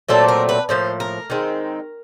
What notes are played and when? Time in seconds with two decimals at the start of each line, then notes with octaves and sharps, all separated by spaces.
0.09 A#2 F#3 A3 C4 A4
0.28 A#4
0.49 B4
0.69 A2 F3 A#3 C5
1.00 A#4
1.30 D#3 G#3 C4